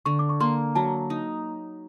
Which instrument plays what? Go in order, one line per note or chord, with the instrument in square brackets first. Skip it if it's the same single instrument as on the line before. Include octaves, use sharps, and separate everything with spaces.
[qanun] D3 [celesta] C#6
[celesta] D6
C#6
[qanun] A#3 [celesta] C6
[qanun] F#3 [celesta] A5
[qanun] D#4